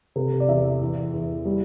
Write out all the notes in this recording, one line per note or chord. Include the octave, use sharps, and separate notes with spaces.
C3 A4
D5
E2 E5
E3
E2
G3